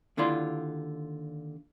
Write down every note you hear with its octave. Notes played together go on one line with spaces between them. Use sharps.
D#2 D3 E4 F4 D5 C6